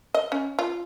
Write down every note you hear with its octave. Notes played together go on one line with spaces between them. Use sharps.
D#5
C#4
F4